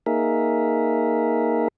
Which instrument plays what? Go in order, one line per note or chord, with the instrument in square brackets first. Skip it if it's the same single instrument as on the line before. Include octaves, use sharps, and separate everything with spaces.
[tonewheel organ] A#3 D#4 G#4 A#4 E5